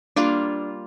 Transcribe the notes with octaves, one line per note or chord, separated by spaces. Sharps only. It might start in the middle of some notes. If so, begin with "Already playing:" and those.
G3 A#3 D4 F4